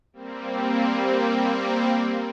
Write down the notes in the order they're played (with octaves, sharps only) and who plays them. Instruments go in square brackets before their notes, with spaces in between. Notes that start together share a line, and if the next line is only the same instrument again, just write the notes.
[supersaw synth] G3 A#3 C4